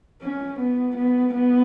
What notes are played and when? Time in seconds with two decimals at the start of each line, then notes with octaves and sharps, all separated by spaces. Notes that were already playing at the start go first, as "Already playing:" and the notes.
0.22 C#4
0.59 B3
0.96 B3
1.34 B3